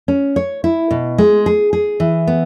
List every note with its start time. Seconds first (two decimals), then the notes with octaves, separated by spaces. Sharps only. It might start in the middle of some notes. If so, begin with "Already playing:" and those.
0.08 C#4
0.36 C#5
0.64 E4
0.91 B2
1.18 G#3
1.46 G#4
1.73 G#4
2.00 E3
2.27 B3